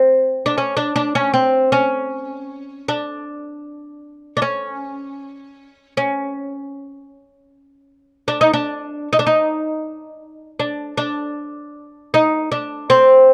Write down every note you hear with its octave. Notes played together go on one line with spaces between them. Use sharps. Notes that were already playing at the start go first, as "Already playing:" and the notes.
Already playing: C4
D4
C#4
D4
D4
C#4
C4
C#4
D4
D4
C#4
C#4
D4
D#4
D4
D#4
D4
D#4
D4
D4
D#4
D4
C4